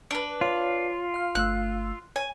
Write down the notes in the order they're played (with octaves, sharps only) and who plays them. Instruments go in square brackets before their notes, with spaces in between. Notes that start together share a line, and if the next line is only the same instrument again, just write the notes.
[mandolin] D4 B4
[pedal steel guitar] F4 [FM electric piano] C#5
[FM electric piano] F5 F6
[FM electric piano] G1 A3 E6 [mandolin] F#6
[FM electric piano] C#5 [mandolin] G#5